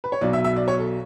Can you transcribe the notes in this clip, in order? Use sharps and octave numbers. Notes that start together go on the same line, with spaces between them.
B4
C#5
B1 B2 F#3 D5
E5
E5
D5
C#5
A4